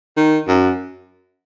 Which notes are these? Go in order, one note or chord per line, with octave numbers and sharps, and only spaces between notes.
D#3
F#2